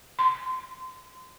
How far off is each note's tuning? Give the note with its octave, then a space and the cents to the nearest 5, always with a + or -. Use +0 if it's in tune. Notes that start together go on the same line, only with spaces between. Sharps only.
C6 -25